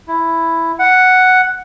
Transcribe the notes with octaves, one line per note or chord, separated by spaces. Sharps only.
E4
F#5